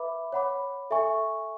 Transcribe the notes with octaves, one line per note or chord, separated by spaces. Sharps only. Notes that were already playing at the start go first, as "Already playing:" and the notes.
Already playing: B4 E5 B5 D6
C#5 F#5 B5 D6
A4 E5 G#5 C#6